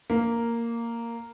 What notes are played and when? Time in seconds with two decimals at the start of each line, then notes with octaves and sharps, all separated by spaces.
0.10 A#3